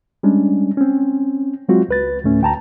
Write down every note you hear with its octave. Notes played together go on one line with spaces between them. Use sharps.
G3 G#3 C#4 D4
C4 C#4
F#3 G#3 C4 F4 F#4
C#2 B4 A6
D2 A2 A3 C#4
D2 G5 A5 A#5